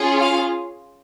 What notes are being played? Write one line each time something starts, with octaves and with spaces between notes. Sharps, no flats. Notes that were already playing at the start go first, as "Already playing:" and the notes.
Already playing: C#4 F4 G#4
F5